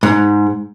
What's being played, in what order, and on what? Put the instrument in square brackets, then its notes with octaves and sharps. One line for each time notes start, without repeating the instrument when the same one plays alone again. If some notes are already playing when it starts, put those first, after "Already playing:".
[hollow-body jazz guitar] G#2